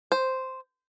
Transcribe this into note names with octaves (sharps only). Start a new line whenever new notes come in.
C5